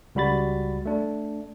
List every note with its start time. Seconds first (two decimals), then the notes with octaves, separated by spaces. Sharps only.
0.15 C#2 G3 F#4 B5 A6
0.85 A3 D4